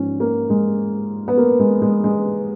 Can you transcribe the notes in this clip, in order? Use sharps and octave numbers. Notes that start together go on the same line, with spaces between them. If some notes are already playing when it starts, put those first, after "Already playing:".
Already playing: G#2 F3 C#4
A#3
G#3
B3
A#3
G#3
G#3
G#3